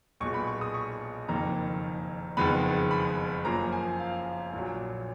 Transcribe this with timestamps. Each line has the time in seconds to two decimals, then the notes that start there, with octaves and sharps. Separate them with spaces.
0.21 B1 A#2 G#3 B3 C#6
0.34 B5
0.47 C#6
0.61 D#6
0.74 C#6
1.28 F#1 F2 D#3 A#3 A#5
2.37 F#1 F2 D#3 G#3 B3 B5
2.91 B5
3.45 F#2 F3 A#3 A#5
3.72 G#5
4.00 F5
4.54 A#1 A#2 F#3